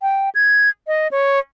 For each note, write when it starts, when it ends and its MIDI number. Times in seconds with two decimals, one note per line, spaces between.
0.02 0.30 79
0.35 0.69 92
0.87 1.08 75
1.11 1.39 73